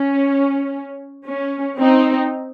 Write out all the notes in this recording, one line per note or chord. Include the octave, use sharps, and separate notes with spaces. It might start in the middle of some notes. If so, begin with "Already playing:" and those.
Already playing: C#4
C#4
C4 D#4